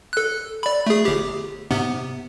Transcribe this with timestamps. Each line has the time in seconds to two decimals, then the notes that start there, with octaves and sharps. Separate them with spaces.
0.13 A4 F#6
0.63 D5 B5
0.87 A3 G#4
1.05 G1 G4
1.71 G#2 C3 B3